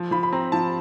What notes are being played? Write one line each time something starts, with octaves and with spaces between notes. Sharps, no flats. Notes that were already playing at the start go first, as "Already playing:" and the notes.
Already playing: F3
F3 B5
B5
C4 A#5
F3 A5